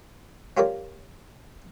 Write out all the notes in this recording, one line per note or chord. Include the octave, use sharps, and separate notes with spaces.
C#4 F4 G4 A#4 C#5 D5